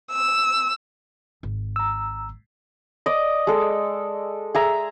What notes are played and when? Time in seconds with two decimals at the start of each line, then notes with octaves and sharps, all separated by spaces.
0.13 E6
1.43 G#1
1.76 A#5 E6
3.06 D5 D#5
3.47 G#3 A4
4.55 G#4 E5 A#5